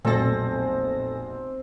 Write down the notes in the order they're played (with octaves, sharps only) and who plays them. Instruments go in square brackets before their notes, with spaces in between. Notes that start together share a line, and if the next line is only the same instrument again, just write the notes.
[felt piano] F1 B1 G#5 [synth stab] A#2 A4 A#6 [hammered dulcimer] C4